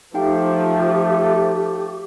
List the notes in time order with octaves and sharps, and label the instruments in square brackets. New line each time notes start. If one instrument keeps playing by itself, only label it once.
[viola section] F3 [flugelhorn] A3 [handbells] D#4 F5 G5 [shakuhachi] G4